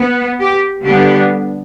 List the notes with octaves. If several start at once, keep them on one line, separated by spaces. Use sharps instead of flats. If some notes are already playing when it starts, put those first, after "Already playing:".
Already playing: B3
G4
D3 G3 B3 D4 G4